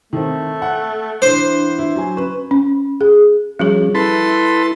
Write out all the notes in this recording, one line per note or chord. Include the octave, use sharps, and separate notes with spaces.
D#3 A3 C4
F#5
E3 D4 C5
E4
F#3 G#5
C#4 B4
C#4
G#4
F3 G3 C#4 F#4 G#4
E4 A4 B4 C6